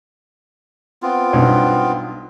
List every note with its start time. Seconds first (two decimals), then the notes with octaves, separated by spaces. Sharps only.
1.03 B3 C4 F4
1.33 B1 G2